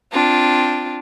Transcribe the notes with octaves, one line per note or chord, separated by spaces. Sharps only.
C4 D4 F4